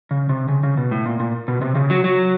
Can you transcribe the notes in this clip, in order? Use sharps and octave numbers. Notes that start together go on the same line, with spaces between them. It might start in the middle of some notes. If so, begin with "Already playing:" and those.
C#3
C3
C#3
C#3
B2
A2
A#2
A#2
B2
C3
C#3
F#3
F#3